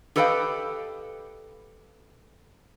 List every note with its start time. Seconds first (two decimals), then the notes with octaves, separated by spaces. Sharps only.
0.16 G4 A4 B4 D#5 F5 G5